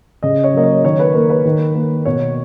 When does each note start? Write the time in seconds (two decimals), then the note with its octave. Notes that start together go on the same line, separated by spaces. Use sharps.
0.23 C#3 D#5
0.44 C#5
0.54 F#3 A#3 D#5
0.63 C#5
0.84 D#3 C#5
0.99 B4
1.14 A#3 A#4
1.29 B4
1.45 D#3
1.75 A#3
2.05 B2 C#5